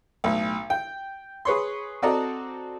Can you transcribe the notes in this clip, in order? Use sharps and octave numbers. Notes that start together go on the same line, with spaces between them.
B1 A2
G5
G#4 B4 C#5 C6
C4 F#4 A4 D5 D#5 A#5